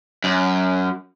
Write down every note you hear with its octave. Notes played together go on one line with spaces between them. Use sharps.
F#2